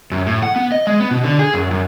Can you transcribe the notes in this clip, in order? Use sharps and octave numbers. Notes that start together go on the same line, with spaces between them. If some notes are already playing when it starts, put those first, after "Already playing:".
F#2
A2
F#5
B3
D#5
G#3
B3
B2
D3
G#4
F#2
F#2